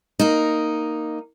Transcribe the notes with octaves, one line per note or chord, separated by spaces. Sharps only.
A#3 D#4